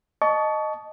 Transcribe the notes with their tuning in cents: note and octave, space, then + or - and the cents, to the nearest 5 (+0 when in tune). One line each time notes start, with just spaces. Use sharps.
D#5 -10 A5 -15 C#6 +30